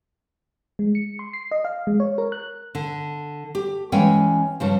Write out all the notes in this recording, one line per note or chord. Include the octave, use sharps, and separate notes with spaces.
G#3
C#7
C6
C7
D#5
F5
G#3
C#5
A#4
F#6
D3
G4
E3 G#3 C#4 F5 G5 G#5
G2 C#3 F3